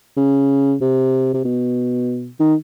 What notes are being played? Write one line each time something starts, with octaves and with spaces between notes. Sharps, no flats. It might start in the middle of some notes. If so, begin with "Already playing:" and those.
C#3
C3
C3
B2
D#3